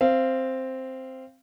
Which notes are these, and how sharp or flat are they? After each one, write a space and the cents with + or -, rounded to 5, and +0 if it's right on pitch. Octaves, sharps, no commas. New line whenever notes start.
C4 +0 F5 -20